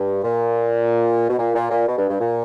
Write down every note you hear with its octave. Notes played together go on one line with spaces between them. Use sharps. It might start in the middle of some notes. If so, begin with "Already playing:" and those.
Already playing: G2
A#2
B2
A#2
A#2
A#2
B2
G2
G2
A#2